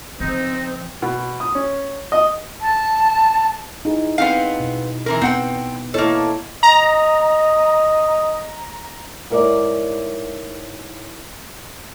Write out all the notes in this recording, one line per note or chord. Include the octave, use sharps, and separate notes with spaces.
C#3 F3 C4 D#4
B2
D#6
C#4
D#5
A5
D#4 E4 G#4
B3 C4 F5
B2
E3 C4 A#4
B3 C4 F#5 G5
A#3 E4 A4 C#5 D#5
D#5 A#5
G#2 E4 A#4 C#5 D5